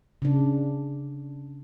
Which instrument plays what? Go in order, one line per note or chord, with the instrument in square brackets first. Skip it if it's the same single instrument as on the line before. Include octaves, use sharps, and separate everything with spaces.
[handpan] C#3 D4